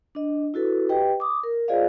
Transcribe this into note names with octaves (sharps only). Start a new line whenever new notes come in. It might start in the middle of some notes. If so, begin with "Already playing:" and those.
D4 D#5
E4 F#4 A4 B4
G4 B4 D#5 G5
D6 D#6
A#4
F4 G#4 C5 D5 D#5 F5